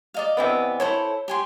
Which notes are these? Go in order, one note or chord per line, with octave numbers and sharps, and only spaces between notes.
D5 D#5 F5
C3 E3 B3
E4 A4 C5 C#5
G4 G#5 C6